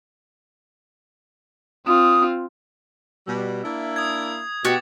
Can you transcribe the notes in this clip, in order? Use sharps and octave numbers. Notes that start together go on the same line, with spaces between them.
C4 F4 D#6
B2 G3
A#3 D4 E4
D#6 G#6
B2 F#4 G4 D6 A6